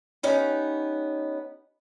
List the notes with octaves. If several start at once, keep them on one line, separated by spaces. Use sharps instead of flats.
B3 C#4 D#4 G4